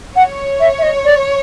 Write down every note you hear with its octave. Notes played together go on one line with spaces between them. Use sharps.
C#5 F#5
E5
E5
D#5
D5